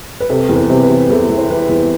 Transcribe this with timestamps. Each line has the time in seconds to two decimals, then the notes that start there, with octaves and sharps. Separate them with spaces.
0.20 B4
0.30 C3 A4
0.49 E2
0.56 B4
0.70 C3
0.83 B4
0.90 E3
1.10 E2 A4
1.30 E2
1.38 C5
1.50 E3 B4
1.69 E2